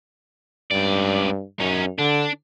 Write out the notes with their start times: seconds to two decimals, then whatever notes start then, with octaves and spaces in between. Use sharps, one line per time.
0.71 C#2 G2 D5
1.60 F#2 C#4 D#4
1.98 D3 D4